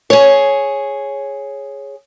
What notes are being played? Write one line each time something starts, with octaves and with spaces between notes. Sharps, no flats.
G#4 C#5